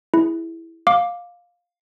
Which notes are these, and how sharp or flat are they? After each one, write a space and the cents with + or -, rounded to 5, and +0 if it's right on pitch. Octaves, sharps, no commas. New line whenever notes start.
E4 +0 G#4 -10
F5 +15 D6 +0